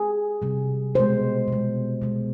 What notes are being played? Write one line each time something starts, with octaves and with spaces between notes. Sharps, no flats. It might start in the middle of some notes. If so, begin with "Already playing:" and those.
Already playing: G#4
C3 G3
B2 G#3 C5
B2 G#3
B2 G#3